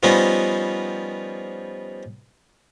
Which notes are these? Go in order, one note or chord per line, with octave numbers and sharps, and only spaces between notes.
F3 G3 B3 C#4 D#4 F4